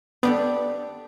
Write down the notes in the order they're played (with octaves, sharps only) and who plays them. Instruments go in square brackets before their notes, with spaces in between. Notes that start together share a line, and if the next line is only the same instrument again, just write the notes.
[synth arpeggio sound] B3 [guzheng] D4 G4 A4